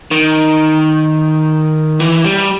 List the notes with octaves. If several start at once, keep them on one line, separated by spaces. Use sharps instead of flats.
D#3
E3
G3